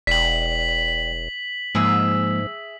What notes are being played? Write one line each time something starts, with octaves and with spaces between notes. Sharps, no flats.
E1 D5 G5 B6 F#7
G#2 F3 G#3 A#3 G#4 E5